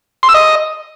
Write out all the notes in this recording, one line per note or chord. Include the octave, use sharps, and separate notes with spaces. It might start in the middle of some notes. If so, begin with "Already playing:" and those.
C6
E6
D#5